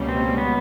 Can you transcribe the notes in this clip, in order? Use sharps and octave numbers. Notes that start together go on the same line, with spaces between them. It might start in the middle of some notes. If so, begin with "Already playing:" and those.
Already playing: C#2 B2 G3 A#3 C#4
C4
B3